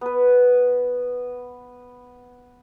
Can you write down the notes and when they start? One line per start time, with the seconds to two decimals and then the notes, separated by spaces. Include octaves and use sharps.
0.01 B3 B4